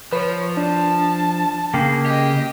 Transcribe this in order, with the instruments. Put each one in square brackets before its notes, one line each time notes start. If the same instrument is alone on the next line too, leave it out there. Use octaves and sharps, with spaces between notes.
[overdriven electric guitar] F3 [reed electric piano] B4 [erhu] C#5
[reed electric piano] D4 [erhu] A5
[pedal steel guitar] C#3 A#3 G#4 [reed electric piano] G5
[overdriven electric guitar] G4 [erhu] D#5